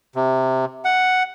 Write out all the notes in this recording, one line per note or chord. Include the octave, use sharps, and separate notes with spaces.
C3
F#5